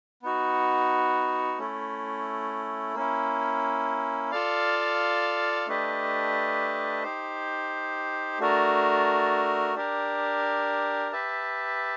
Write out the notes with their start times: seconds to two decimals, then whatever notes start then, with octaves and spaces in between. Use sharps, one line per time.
0.23 B3 D#4 F#4
1.58 A3 C#4 E4
2.94 A#3 C#4 E4
4.31 F4 A4 D5 F5
5.67 A3 D4 G4 B4 D#5
7.03 D#4 G4 C5
8.39 A3 D4 F#4 A#4
9.75 D4 G4 A#4
11.12 G4 B4 E5 A5